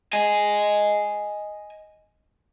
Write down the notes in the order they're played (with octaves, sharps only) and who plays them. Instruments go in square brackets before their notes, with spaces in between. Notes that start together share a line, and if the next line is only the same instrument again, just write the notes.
[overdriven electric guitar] D#5 G#5